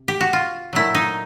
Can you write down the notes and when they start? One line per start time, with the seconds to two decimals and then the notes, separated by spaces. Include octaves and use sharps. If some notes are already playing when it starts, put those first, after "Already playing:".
Already playing: C3
0.08 G4
0.21 F#4
0.33 F4
0.73 A#2 F#3 A3 E4
0.95 D#4